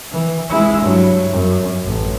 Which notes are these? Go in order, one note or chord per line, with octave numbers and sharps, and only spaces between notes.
E3
G#3 E4
G2 F#3
F#2
A1